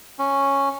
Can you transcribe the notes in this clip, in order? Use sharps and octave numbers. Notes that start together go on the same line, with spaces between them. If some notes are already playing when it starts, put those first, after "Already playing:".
C#4